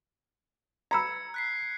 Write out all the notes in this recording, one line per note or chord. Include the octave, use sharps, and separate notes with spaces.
A#5 B5 E6 G#6 C#7
F#6 B6 C7